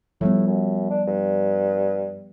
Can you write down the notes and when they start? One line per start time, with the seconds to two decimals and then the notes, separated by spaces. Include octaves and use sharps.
0.21 A2 F3 G3 B3
0.47 F#2
0.90 D4
1.07 G2